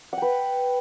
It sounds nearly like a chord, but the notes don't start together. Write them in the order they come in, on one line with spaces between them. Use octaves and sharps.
F#5 G5 B4